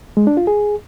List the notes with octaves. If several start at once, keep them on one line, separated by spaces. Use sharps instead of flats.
G#3
D4
F4
G#4